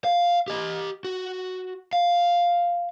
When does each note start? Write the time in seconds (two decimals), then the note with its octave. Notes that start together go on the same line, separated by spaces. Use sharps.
0.04 F5
0.48 G4 D#5
1.04 F#4
1.93 F5